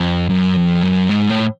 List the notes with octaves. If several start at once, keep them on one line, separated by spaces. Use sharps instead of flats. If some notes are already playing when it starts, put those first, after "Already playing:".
Already playing: F2
F#2
F2
F#2
G#2
A2